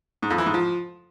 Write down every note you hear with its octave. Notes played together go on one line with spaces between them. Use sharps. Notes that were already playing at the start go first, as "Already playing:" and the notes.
G#2
F2
E3
G#2
F3